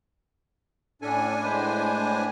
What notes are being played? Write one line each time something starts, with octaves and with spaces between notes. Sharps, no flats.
A2 C#4 D4 A4 G#5
G#3 B4 C5